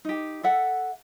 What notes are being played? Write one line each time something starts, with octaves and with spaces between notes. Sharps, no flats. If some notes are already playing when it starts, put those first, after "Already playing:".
D#4 G4
A4 E5 F#5